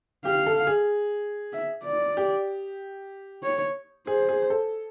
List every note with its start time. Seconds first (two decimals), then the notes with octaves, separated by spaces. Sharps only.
0.25 G4 F5
0.46 A4
0.67 G#4
1.53 E5
1.84 D5
2.17 G4
3.43 C#5
4.07 G#4 C5
4.29 G#4
4.50 A4